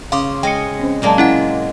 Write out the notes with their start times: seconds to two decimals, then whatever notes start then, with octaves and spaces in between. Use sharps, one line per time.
0.12 C#3 F5 C6 D6
0.43 G#3 D#5 G5 C#7
0.79 C4 C#4 C5
1.02 A#2 F#3 G#3 A#3 D5 A5
1.18 C#4 E4 F#5